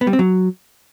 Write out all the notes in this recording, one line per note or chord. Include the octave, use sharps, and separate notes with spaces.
B3
G3
C4
F#3